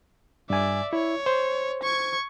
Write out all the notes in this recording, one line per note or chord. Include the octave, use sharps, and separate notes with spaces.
G2 D5 E5 G#5
E4 C#5
C5
C#6 G#6